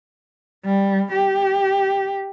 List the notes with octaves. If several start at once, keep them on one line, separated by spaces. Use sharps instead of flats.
G3
G4